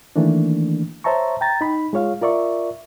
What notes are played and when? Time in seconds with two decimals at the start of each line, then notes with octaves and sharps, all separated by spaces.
0.16 D#3 E3 A3 A#3 D4
1.04 C5 C#5 E5 A5 A#5 C#6
1.41 G5 A#5 A6
1.61 D#4 B5
1.93 G#3 F4 C#5 F5
2.21 F4 A#4 D5 E5 C#6